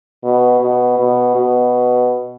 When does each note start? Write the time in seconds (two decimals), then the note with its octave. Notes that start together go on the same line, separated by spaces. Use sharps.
0.24 B2
0.60 B2
0.98 B2
1.35 B2